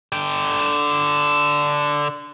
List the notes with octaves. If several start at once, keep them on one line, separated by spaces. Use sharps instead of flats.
D3 G5